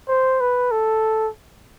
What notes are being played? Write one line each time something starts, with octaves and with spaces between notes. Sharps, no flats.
C5
B4
A4